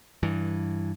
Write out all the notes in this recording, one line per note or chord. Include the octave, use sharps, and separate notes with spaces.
G2 E3